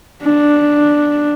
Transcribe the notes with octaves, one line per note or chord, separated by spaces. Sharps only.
D4